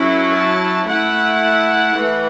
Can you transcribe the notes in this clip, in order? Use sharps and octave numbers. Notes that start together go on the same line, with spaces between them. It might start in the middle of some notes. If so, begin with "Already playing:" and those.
Already playing: F#3 C#4 E4 A4
A5
A3 E4 F#5
E3 A3